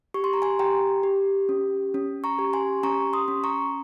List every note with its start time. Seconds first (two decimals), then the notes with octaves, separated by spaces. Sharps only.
0.14 G4 C#6
0.24 C6
0.33 A#5
0.42 G#5 C6
0.59 G4 G5 A#5
1.03 G4
1.49 C#4
1.94 C#4
2.24 A#5 C#6
2.39 G4
2.53 G#5 C6
2.83 C#4 A#5 C#6
3.13 C6 D#6
3.28 C#4
3.44 A#5 C#6